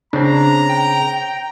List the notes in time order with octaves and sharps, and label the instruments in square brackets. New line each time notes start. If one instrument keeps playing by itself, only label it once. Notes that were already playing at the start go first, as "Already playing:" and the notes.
[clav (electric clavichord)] C#3 C4 [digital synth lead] D4 [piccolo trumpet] A#5
[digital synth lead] G5